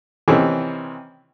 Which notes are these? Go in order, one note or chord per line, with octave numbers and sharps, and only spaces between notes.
C3 D#3 E3 C4 C#4